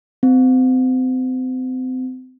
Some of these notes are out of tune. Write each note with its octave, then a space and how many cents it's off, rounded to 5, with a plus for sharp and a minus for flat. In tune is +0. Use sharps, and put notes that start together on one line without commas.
C4 -35